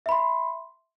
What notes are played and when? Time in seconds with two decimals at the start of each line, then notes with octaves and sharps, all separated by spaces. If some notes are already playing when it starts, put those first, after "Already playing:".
0.06 E5
0.09 B5
0.12 C6